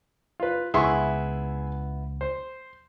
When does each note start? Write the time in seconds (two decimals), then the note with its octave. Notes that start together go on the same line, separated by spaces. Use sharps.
0.40 F4 B4
0.74 C#2 B3 E4 G#4 C6 C#6
2.21 C5